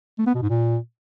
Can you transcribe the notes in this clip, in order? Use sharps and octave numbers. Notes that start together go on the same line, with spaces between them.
A3
B3
B2
G#2
A#2